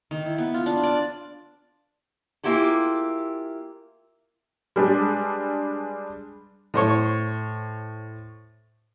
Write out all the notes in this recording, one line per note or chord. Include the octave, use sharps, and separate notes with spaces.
D#3
E4
B3
F4
D4
D5
A#3 E4 F4 G4 G#4
G3 G#3 D4 B4
A2 C5 C#5